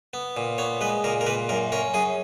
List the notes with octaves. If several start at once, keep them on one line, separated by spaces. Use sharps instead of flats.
B3
A#2
B3 C#5
G#3 B4
A#2 A#4
A#4
A#2 B4
F#2 A#4
C#4 A#4
F#2 G#4